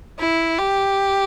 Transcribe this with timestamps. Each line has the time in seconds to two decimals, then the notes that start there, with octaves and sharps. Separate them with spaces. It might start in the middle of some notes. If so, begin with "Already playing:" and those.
0.19 E4
0.58 G4